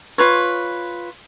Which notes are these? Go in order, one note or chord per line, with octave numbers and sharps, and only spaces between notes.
F4 B4 C#5